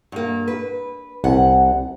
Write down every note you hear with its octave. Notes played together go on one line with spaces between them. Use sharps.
G2 A#3
B4
C2 F#5